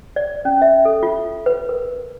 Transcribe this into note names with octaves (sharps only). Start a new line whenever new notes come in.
D5
C#4
E5
A4
F4
B4
A#4